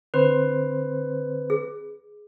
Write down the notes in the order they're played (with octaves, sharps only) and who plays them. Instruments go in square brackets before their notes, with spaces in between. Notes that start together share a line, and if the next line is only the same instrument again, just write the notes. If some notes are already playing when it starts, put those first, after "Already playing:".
[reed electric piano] D3 C4 C5 [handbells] B4
[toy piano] G#4